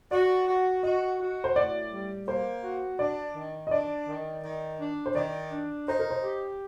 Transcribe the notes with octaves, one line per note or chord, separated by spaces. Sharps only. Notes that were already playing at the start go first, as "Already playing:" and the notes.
F#4 D5
F#4
F#4 D#5
F#4
C5
A2 D5
G3
A#3 C5
F#4
D4 D5
D#3
D#5
D4 D5
D#3
D#3
D4
C5
D#3 D5
D4
D#4 C5
A#4
C5
G4